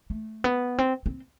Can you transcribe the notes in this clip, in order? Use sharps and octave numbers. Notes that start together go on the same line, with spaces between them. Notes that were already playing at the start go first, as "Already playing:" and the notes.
A3
B3
C4
C4